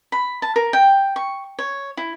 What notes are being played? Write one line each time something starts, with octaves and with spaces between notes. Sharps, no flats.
B5
A5
A#4
G5
C#6
C#5
E4